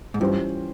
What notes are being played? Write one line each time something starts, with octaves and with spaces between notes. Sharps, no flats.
G#2
G2 E3 G3 C#4 F4 C5